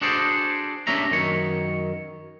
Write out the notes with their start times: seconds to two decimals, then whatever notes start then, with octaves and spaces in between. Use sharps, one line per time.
0.01 D4 F#4 G#4 A4 C5 D5
0.87 C#4 D4 G4 C#5 E5 A#5
1.11 F#2 D#3 C#5